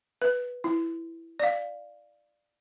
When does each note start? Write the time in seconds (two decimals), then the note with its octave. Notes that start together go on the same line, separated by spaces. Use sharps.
0.22 B4
0.64 E4
1.39 D5 F5